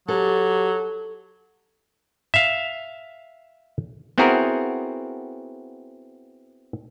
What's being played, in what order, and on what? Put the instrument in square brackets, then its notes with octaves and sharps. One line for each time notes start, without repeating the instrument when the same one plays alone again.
[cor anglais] F#3 [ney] G4 [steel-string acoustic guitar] A4
[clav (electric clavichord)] E5 F5
B3 C4 E4 F#4 G#4 A#4